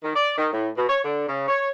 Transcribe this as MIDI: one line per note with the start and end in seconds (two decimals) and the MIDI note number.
0.03 0.11 51
0.15 0.37 74
0.38 0.49 51
0.52 0.68 45
0.77 0.86 47
0.88 0.99 73
1.04 1.25 50
1.27 1.45 49
1.48 1.70 73